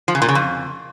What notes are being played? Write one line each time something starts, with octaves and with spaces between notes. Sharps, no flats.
F3
C#3
A#2
C#3
F2